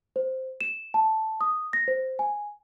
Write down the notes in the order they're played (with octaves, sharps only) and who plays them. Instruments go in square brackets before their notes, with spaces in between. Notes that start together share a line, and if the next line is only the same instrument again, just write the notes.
[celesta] C5
E7
A5
D#6
A#6
C5
G#5